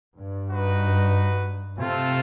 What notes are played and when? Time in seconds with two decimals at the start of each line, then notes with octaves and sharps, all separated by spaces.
0.16 G2
0.50 D#4 F#4 B4
1.77 C3 A3 C4 F4 A4